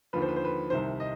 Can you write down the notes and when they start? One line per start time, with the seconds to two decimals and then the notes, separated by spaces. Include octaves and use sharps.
0.13 D#2 D3 F3 B4
0.22 C5
0.29 B4
0.36 C5
0.45 B4
0.70 C2 C3 D#3 C5
1.00 D#5